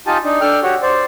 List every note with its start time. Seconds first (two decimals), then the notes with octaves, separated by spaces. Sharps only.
0.07 D#4 F4 G4 G#5 A5
0.24 D4 D#4
0.41 D4 A4 G5 F6
0.63 F#4 G4 C#5
0.82 C5 D5